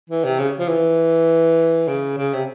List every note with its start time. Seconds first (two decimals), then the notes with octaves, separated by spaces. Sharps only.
0.09 E3
0.24 C3
0.39 C#3
0.59 F3
0.68 E3
1.88 C#3
2.18 C#3
2.33 C3